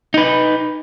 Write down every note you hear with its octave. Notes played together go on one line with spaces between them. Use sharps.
D#4 B4